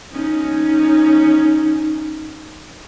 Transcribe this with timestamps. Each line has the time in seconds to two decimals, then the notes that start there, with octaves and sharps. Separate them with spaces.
0.12 C#4 D#4